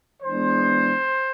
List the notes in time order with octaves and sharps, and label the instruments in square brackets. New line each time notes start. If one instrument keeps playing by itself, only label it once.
[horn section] E3 G#3 B3 D4 C5